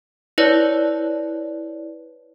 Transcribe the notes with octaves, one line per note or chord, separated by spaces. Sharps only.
E4 B4 C#5 D5